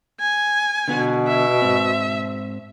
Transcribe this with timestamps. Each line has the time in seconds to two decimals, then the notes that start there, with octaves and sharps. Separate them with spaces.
0.20 G#5
0.88 B2 D3 B3 F#4
1.28 E5
1.62 G#2 C4